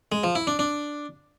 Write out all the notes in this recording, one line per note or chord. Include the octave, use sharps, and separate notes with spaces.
G#3
F3
E4
D4
D4